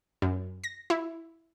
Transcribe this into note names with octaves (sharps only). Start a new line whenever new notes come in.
F#2
A#6
E4